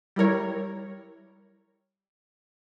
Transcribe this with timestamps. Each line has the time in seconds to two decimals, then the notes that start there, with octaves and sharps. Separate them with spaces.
0.16 G3 E4 A#4 C#5